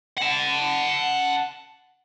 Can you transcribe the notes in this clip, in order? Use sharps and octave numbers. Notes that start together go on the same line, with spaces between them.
F#5 A5